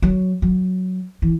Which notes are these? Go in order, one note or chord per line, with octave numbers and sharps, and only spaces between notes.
F#3
F#3
E3